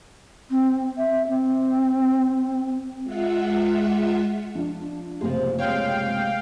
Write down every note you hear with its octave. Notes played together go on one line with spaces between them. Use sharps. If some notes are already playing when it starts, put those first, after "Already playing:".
C4
E5
C4
G#3 F4 E5 F#5
F3 D4
F#1 A2 C3 F3 G#3
G#3 C#5 F5 G5